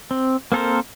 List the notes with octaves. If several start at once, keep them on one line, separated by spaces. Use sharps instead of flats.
C4
A#3 C4 A4 A#4 C5